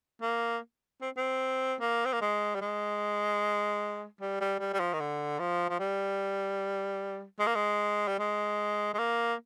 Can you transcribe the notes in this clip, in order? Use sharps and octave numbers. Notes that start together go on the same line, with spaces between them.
A#3
C4
C4
A#3
C4
A#3
G#3
G3
G#3
G3
G3
G3
G3
F3
D#3
D3
F3
F3
G3
G#3
A#3
G#3
G3
G#3
G#3
A#3